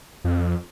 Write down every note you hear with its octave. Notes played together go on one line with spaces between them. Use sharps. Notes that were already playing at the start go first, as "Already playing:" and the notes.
F2